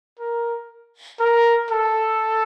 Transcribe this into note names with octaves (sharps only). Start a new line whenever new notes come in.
A#4
A#4
A4